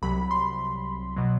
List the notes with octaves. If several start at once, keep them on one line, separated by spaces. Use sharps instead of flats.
C2 C3 F#3 B5
C6
B2 F#3